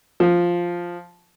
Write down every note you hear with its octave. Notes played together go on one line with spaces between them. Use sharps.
F3